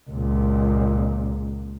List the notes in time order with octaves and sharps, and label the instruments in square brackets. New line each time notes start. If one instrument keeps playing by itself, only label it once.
[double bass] C#2 A#2